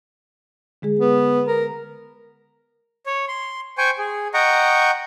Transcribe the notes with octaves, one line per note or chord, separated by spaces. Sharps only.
D3 G#3 G#4
B3
A#4
C#5
C6
C5 G5 G#5 C#6
G#4
D#5 F#5 G5 A#5 C#6